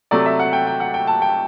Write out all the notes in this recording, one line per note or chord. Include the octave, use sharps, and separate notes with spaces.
C3 F#3 A3 D5
E5
F#5
G5
G5
F#5
G5
A5
G5